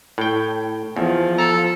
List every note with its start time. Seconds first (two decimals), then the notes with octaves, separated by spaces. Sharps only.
0.18 A2 G5
0.96 E2 F3
1.38 A4 A#5